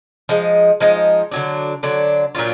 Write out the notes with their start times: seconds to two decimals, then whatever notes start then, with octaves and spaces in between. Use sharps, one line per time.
0.29 F3 G#3 D#4
0.80 F3 G#3 D#4
1.31 D3 F#3 D4
1.83 D3 F#3 D4
2.35 A#2 F#3 D4 F4